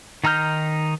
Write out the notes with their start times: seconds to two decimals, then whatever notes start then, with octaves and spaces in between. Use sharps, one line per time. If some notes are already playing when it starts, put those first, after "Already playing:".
0.24 D#3 D#4 A#5 F6 G6